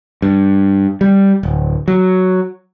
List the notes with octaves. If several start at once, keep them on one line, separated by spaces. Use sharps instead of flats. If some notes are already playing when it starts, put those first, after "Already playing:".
G2
G3
D1
F#3